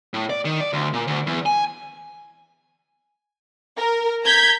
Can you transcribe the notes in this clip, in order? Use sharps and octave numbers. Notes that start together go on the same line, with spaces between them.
A2
D5
D#3
D5
D2
A#2
D2
E2
G#5
A#4
A#5 G6 G#6 B6